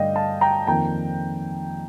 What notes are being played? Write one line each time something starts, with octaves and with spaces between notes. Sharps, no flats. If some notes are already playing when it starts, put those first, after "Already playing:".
Already playing: G2 D3 A3 D5 D#5 F5 G5
F5 A5
G5 A#5
F2 D#3 A#3 G5 A#5